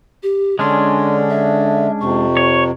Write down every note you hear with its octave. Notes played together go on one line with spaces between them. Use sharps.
G4
D3 G#3 C#4 D4 C6
E5
F2 C3 C#6
C#5